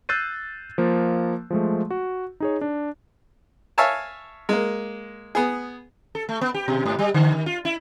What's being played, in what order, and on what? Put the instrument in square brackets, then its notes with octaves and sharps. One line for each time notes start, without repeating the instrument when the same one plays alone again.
[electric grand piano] E6 F#6 G6 A6 C7 D#7
F3 A#3
F3 G#3 A3
F#4
D#4 G#4 C#5
D4
[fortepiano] C#5 E5 F5 G#5 A5
G#3 A#3
B3 G#4
[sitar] A4
A3
B3
G4
B2
G#2
G3
D3
D#3
F4
E4